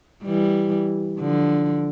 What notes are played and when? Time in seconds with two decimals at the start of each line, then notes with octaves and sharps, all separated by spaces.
0.25 E3 G3
1.20 D3 F3